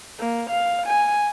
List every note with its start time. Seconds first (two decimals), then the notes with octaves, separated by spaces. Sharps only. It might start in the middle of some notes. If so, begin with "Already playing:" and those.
0.19 A#3
0.50 F5
0.87 G#5